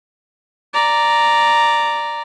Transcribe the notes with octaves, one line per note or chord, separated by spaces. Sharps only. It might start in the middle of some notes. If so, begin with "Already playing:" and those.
D5 A#5